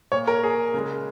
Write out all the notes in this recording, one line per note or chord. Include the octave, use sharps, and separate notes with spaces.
A#2 A#3 C#5
A#4
G#4
C#3 G#3